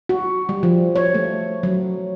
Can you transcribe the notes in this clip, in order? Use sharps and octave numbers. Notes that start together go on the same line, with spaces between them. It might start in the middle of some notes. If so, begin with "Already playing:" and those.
F#4
G3
F3
C#5
A3
F#3